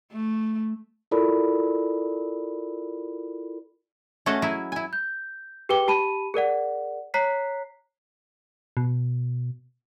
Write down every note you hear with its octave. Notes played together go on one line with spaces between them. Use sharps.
A3
E4 F4 A4 A#4 D5 B5
A3 C#4 F#4 G#4 D#5 A5
F#3 E4 G#4 E5 G#5
E4 G#5
G6
G4 G#4 B4 G5 D6 G7
G4 A5 B5 D#7
G#4 A#4 D5 F#5
C#5 A#5 F#6 B6 C7
B2